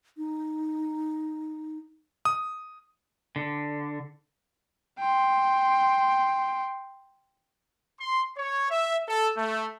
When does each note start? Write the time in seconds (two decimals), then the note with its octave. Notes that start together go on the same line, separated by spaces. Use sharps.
0.17 D#4
2.25 D#6
3.36 D3
5.00 G5 C6
7.99 C6
8.37 C#5
8.70 E5
9.08 A4
9.37 A3